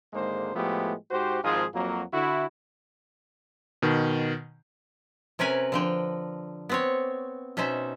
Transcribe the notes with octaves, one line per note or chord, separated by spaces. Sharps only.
G#1 G#2 D3 G#3 A#3 C5
A2 F3 G#3 A3 B3 G4
G#2 F#4 G4 C5
G#1 G#2 F3 F4 G#4
F2 F#3 A#3
D3 E4 F#4
B2 D#3
C3 C#4 A#4 B4 G#5
D3 F3 G5
B3 C4 C#5
B2 C#4 D#4 C5 E5